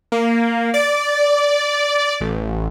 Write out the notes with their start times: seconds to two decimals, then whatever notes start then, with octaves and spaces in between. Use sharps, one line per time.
0.12 A#3
0.74 D5
2.21 A1